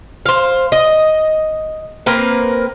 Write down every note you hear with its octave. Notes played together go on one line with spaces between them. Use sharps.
C5 F5
D#5
A#3 C4 A#4 B4